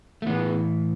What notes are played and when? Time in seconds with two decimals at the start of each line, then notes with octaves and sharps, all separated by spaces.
0.22 A3
0.26 A2 E3 B3